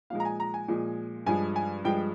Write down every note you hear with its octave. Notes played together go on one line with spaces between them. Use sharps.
A#2 F3 G#3 F5
A#5
G#5
A#5
G#5
A#2 F3 G#3
G2 F3 G#3 G#5
G#5
G2 F3 G#3 G5